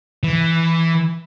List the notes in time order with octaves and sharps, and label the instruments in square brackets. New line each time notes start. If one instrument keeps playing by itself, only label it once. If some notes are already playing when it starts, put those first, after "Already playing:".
[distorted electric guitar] E3